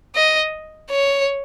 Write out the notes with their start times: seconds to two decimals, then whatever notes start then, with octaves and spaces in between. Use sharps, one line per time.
0.15 D#5
0.90 C#5